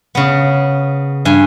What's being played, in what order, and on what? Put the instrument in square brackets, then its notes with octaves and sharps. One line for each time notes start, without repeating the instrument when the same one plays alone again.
[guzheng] C#3 B3
G2 G#5